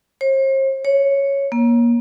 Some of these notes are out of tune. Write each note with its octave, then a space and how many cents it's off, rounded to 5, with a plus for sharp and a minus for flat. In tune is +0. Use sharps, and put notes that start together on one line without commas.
C5 +45
C#5 +0
A#3 +25